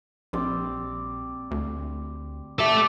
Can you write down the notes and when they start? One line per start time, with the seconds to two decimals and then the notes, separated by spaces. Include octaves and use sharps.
0.33 A#1 G3 C4 D5
1.51 D2
2.59 G4 A4 D5 E5